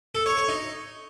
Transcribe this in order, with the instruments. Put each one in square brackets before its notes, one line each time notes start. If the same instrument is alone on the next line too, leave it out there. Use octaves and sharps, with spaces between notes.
[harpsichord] A4
C#5
C#5
D#4